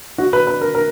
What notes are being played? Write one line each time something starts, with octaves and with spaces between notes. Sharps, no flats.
F#4
B4
B4
A#4
A#4